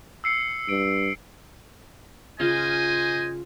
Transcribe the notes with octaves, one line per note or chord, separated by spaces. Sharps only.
E6 C7 C#7
G2 D7
C#3 F4 C5 D#5 G#5